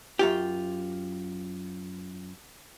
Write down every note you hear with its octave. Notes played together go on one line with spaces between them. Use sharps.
F#2 F4 G4